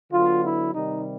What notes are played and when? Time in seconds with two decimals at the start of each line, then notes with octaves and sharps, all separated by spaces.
0.12 D3 F#3 B3 F4
0.43 E4
0.74 C3 D#3 G3 D#4